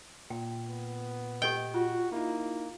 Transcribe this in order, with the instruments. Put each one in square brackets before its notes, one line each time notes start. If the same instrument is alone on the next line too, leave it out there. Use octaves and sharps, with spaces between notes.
[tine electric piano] A#2 [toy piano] G5
[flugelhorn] B3
[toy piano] G4 A4 D#5 [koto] G5
[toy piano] F4 [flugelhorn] F#4
[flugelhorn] A#3 [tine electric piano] D#4 E4